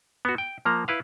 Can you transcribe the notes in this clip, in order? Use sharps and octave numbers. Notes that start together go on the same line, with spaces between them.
B3 F#4
G5
F3 A#3 A#5
E4 B4 F5